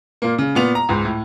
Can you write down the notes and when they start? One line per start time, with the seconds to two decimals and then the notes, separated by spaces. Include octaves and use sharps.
0.22 A#2 A#3
0.38 C#3
0.55 A#2 B3 F7
0.75 A#5
0.89 C#2 G#2
1.05 A2